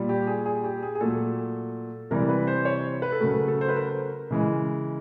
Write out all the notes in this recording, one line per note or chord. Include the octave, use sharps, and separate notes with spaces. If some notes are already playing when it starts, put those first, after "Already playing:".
Already playing: A#2 G3
G4
G#4
G#4
G4
G#4
G#4
A#2 F#3 A3 A4
C3 E3 G3 A#4
B4
C5
C#5
B4
A4
C#3 F#3 A3 A#4
A4
C5
B4
A#4
C#3 E3 G#3